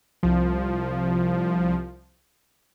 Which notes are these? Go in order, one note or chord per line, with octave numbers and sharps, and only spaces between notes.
C2 F3